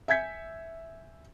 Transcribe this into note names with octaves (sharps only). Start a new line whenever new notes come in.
E5 G#5 G6 G#6 B6 C#7